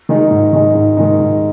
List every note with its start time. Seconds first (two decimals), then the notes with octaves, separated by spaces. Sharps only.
0.09 D#3 G#3 D#4
0.31 G#2
0.53 D#3 G#3 D#4
0.75 G#2
0.97 D#3 G#3 D#4
1.20 G#2